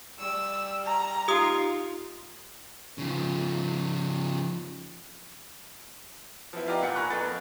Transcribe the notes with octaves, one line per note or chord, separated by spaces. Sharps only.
G3 E6
A#5
D#4 F4 G4 D#6
C#3 F3
F3 B3 E4
B3 D#4 F4 G4 D5 A#5
A#2 F#5 C#7
G#5 A#5 B5 C#6 F6 F#6
F2 B3 A4 F#6 A6
A#3